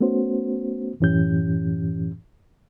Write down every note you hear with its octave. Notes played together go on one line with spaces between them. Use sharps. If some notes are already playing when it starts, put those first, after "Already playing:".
A3 B3 C#4 F#4 C5
F#2 A2 E3 C#4 G4 G6